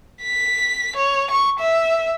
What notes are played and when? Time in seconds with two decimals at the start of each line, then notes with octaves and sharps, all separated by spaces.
0.23 B6
0.96 C#5
1.31 C#6
1.59 E5